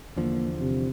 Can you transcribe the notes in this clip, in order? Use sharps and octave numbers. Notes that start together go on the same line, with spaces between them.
E2 D3 F3 A#3
C3